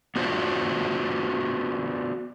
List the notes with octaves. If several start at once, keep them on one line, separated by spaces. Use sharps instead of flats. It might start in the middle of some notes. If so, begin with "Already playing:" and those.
B3 D4 F4 F#4 C5